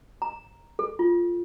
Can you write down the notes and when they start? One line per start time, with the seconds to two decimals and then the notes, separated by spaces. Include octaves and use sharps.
0.22 A#5
0.79 A4
0.99 F4